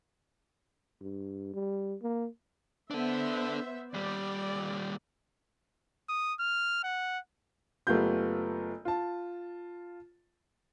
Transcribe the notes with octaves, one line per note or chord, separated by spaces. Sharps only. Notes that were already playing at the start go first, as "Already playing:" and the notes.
G2
G3
A#3
B3 D4 A4 C5 E5
D#2 G3 D5
D#6
F6
F#5
F#1 A3 B3 F4 G4 G6
F4 A5